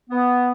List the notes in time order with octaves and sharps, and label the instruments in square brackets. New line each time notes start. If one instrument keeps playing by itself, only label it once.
[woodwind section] B3